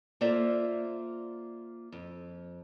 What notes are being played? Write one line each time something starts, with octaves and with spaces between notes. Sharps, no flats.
A#3 F4 A4 C5 D5 E5
F2